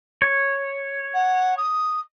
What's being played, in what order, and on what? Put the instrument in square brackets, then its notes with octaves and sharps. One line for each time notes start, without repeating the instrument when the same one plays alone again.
[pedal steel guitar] C#5
[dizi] F#5
D#6